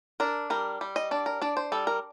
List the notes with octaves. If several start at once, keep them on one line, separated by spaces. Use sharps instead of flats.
D4 A#4
G3 A#4
G3
D#5
D4 D5
A#4
D4 D5
C5
G3 A4
A#4